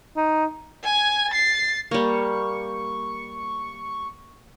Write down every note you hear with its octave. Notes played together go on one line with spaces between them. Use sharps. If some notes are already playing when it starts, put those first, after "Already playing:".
D#4
G#5 G#6
A6 C7
G3 A#3 C#6